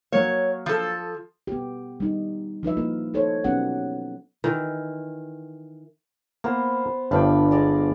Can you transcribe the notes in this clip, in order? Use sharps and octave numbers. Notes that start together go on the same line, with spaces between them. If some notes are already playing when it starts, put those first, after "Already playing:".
F#3 A#3 C#5
F3 A4
B3 G4
G3 D#4
F3 D#4 B4 E5
A#3 E4 A#4
D#4 A4 C5 C#5
F#3 B3 C#4 D#4 G4 F#5
D#3 E3
A#3 B3 C5
G1 G2 D4 F5 G5 B5
G#3 D5 D#5